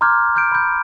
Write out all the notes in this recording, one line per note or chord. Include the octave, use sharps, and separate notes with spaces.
A#5 C6 D6 F6 G6 G#6
F6 G6 D7
B5 G6